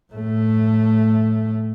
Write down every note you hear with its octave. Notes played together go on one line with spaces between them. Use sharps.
A2 A3